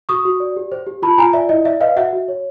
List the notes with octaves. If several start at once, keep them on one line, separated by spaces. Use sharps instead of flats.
F#4 C#6 D#6
F#4
D5
G4
C5
G4
F4 A5 B5
F4 G#5 A#5
D5 E5
E4 D#5
D5 E5
B4 D#5 F5
F#4 E5 F#5
F#4
C#5